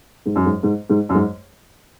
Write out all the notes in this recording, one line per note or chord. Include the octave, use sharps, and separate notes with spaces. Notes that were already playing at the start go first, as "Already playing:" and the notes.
G#2
F#2
G#2
G#2
G#2
F#2
G#2